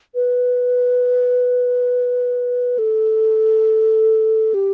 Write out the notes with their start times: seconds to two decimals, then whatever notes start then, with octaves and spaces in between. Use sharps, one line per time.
0.15 B4
2.78 A4
4.54 G4